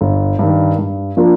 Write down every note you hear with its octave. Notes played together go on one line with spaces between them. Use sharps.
G1
G2 D#3
G2
F3 A#3 D4 F4